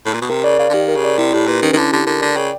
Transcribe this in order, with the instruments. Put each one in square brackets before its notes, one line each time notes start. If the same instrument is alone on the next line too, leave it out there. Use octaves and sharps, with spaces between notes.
[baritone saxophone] A2
A#2
B2
[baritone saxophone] C3 [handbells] A#4
[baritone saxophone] C#3 [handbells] D5
[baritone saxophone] C#3 [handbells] F5
[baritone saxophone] D3
[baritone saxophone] D#3 [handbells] G4
[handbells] A#4
[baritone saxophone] C#3
[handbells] D5
[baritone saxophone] C3 [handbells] E4
[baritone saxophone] A2 [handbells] G4
[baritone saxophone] A#2 [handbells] B4
[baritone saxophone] D#3 [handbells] C#4
[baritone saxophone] D#3
[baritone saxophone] D3 [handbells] E4
[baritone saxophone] D3 [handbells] G4
[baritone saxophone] D3 [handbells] A#4
[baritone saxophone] D3 [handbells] D5
[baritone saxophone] C#3 [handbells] G5